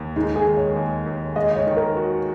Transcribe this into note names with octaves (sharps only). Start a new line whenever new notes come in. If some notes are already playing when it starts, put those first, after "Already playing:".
Already playing: D#2
G#3 D#4
G#4
D#3
C#5
D#2
D#2
G#3 D#5
D#5
C#5
D#3
A#4
F#4